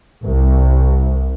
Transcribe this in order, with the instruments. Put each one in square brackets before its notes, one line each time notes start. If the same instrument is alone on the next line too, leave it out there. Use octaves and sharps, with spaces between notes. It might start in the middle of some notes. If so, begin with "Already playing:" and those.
[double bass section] C2